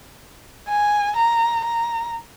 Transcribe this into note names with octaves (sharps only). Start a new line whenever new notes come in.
G#5
A#5
A#5